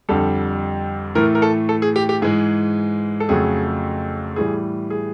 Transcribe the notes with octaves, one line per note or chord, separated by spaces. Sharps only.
F2 D3 G3 A4
A2 E3 A3 A#4
A#4
A4
A4
G#4
G4
G4
G#2 E3 G#3 G#4
A4
F2 C#3 F#3 A3 G#4
A2 E3 G3 G#4
G#4